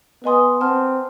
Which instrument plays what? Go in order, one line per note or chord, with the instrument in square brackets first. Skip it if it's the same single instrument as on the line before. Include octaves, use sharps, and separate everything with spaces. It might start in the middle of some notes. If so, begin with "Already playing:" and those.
[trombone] B3 [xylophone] B4 D#5 G#5 C6 D#6
[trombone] C4 [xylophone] F#5 A5 C6 F6